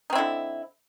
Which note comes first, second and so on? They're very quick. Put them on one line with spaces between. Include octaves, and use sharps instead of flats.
D#4 C4 E4 D3